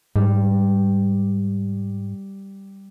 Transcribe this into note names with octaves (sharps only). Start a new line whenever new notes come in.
G#2 G3